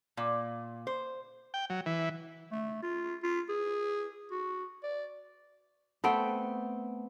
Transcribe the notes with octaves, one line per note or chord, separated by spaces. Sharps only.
A#2
C5
G5
F#3
E3
A3
F4
F4
G#4
F#4
D5
A3 B3 C4 G5